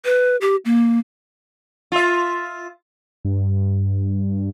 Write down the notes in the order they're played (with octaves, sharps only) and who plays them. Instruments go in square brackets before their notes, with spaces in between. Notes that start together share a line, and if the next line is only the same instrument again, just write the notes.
[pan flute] B4
G4
A#3
[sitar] F4 E5
[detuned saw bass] G2